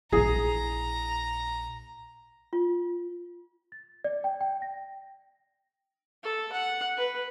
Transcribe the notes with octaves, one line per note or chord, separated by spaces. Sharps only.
A#1 E4 G#4 A#5
F4
A6
D5
G5
G5
A#6
A4
F#5
B4